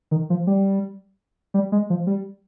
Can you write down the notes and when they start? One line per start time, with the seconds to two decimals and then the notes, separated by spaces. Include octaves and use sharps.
0.11 D#3
0.30 F3
0.47 G3
1.54 G3
1.72 G#3
1.90 F3
2.07 G3